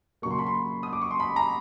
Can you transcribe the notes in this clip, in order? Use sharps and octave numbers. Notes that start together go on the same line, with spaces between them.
C#3 F#3 A#3 C#6
C6
B5
C6
D#6
D6
C#6
C6
B5
A#5